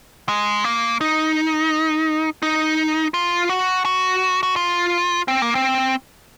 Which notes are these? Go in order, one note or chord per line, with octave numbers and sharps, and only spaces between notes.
G#3
A#3
D#4
D#4
F4
F#4
F#4
F#4
F4
C4
A#3
C4